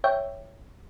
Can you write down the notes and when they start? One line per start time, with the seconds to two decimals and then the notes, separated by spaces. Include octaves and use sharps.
0.04 C#5 E5 G5